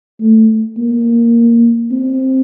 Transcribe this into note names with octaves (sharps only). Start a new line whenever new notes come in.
A3
A#3
C4